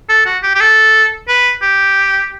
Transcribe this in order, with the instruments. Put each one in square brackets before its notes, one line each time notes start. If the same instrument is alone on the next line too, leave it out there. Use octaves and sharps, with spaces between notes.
[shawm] A4
F#4
G4
G4
A4
B4
G4